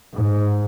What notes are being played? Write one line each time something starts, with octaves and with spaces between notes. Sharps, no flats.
G#2